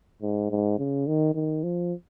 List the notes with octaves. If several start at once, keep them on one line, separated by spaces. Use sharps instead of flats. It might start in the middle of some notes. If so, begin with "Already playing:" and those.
G#2
G#2
C#3
D#3
D#3
F3